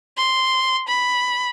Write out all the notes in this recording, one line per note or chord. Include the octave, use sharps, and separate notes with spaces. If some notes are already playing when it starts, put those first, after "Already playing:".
C6
B5